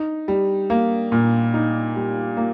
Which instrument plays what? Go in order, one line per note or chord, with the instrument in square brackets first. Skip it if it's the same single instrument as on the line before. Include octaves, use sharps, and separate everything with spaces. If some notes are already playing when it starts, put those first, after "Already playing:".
Already playing: [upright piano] D#4
G3
A#3
A#2
D#4
G3
A#3